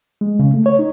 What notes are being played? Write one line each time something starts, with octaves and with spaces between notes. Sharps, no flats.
G#3
C#3
A3
C#5
D#4